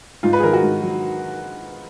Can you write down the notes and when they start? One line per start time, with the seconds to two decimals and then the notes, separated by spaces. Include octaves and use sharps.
0.23 G#2 F4
0.33 B4
0.39 G#4
0.43 D#3 A#4
0.53 F#4
0.63 G#2
0.82 F#3